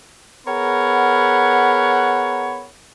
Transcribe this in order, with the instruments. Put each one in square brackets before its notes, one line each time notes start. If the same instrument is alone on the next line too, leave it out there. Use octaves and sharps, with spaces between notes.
[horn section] B3 G#4 A#4 C#5 F#5 B5